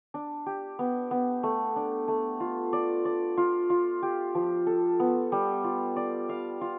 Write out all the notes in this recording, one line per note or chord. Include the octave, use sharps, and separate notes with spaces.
D4
G4
B3
B3
A3
D4
A3
F4
D5
D5
F4
F4
G4
F3
A4
B3
G3
F4
D5
F5
F4